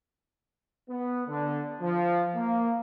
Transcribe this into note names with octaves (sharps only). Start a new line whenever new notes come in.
B3
D3
F3
A#3